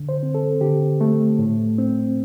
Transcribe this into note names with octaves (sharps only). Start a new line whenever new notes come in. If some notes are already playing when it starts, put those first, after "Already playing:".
Already playing: D3
C5
C4
A4
D3 G4
A3
A2
C4